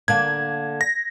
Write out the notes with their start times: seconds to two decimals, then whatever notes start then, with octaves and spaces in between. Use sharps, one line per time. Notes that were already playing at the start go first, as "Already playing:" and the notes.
0.08 D3 A#3 D4 G#6
0.81 A#6